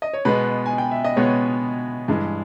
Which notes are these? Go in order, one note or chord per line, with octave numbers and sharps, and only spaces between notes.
D#5
C#5
B2 G#3 B3 B4
G#5
G5
E5
D#5
B2 G#3 B3 C#5
G2 E3 G#3